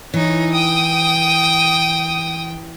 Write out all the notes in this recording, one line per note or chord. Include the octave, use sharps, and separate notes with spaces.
E3 D#4 C#5
G5 D#6